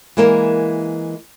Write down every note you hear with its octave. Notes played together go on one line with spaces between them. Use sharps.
E3 G#3 A#3 E4 A#4